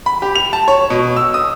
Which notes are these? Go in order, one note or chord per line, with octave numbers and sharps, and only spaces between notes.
B5
G4
F7
A5
C#5
B2
E6
D#6